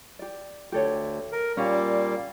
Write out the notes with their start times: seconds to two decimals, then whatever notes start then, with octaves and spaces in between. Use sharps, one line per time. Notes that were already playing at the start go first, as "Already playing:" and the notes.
0.19 G4 D5
0.72 D2 G4 A4 C#5
1.32 A#4
1.57 A#2 G3 A#3 C#4